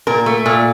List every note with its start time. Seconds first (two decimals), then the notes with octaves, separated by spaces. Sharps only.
0.07 A#2 A#4
0.26 A3
0.46 A#2